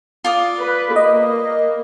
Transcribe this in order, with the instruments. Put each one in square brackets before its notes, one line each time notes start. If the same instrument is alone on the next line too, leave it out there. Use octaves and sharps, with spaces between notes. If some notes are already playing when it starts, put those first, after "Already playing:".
[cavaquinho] F4 D5 D#6
[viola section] B4
[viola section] A#3 [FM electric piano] D#5